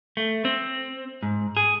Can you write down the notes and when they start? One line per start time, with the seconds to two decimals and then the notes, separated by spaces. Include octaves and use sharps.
0.17 A3
0.45 C4
1.23 G#2
1.57 G#4